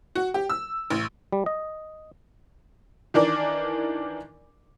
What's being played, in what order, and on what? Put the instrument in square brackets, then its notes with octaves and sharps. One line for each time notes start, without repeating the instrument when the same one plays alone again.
[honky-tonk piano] F#4
G4
E6
A1
[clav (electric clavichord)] G3
D#5
[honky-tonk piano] D#3 E3 D4 A#4 D5